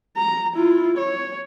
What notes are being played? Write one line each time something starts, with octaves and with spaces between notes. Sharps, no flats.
A#5
E4 F4
C#5